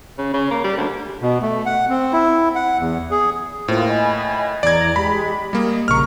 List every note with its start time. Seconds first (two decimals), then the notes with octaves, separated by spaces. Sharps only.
0.18 C#3
0.34 C#3
0.51 A#3
0.64 G3
0.77 D2
1.22 B2
1.42 A3
1.66 F#5
1.89 C4
2.13 E4
2.55 F#5
2.79 E2
3.11 G#4
3.68 A2 A#3 F4 C5
3.89 D#5 G#5 B5
4.63 E2 D5 A#5 G#6
4.96 G#3 G4 B5
5.53 G3 A#3 D#5
5.88 A#1 C#3 A#5 C#6 F6